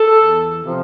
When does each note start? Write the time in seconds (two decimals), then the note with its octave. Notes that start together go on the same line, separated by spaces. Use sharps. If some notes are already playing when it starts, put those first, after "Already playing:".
Already playing: A4
0.18 E2
0.62 C3 F3